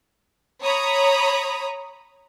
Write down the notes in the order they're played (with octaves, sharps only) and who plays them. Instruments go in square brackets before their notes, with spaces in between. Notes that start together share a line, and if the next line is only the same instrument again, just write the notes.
[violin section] C#5 A#5 B5 D#6